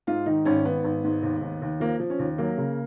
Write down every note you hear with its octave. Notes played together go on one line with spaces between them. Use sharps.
G#2 F4
D#3 D#4
G#1 C#4
G#1 B3
G#1
G#2
D#2
D#2
D#2
F3 A#3
F3
C#4
D#2
F#3 A#3
C#3